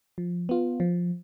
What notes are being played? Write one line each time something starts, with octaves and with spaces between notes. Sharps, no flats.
F3
B3 F4
F3